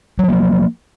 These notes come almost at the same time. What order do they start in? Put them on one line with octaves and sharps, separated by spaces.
F#3 F3 A#3